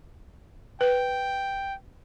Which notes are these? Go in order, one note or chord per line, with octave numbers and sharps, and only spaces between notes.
B4 G5